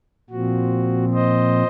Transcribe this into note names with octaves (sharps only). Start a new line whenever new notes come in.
A#2 F3 C4 F#4
C5 D#5